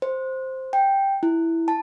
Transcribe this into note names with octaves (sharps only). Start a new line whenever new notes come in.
C5
G5
E4
A5